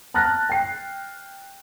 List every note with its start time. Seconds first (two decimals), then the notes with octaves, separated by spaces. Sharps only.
0.14 A5 F6 F#6 A6 A#6
0.49 G5 C7